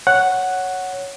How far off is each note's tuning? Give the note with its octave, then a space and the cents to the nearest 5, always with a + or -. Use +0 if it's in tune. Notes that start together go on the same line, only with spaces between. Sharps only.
C#5 +0 F#5 +0